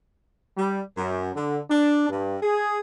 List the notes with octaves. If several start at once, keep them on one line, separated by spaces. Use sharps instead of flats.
G3
F#2
D3
D4
G2
G#4